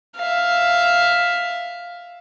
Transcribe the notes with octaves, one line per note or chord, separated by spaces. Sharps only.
E5 F5